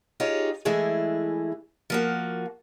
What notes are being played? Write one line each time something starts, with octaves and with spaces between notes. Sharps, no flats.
D#4 F4 G4 G#4 C#5
E3 G#3 A3 E4 G#4
F3 A#3 F#4